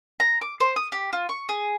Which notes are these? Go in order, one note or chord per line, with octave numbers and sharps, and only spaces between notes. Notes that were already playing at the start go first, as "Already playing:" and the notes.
A#5
D6
C5
D#6
G4
F4
C#6
G#4